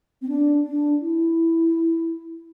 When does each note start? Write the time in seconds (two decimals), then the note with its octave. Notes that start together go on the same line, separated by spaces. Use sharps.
0.22 C4
0.29 D4
0.64 D4
1.01 E4